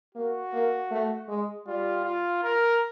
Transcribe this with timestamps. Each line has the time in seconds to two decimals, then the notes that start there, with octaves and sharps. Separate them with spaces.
0.15 A#3 F#4
0.53 A#3
0.91 A3
1.28 G#3
1.67 G3 F4
2.05 F4
2.43 A#4